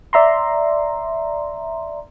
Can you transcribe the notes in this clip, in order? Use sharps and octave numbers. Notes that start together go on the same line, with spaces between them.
D5 E5 A#5 C6